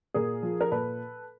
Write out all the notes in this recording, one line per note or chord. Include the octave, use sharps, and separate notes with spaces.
A#2 G#4 A#4
F3
A#4
A#2 A4 B4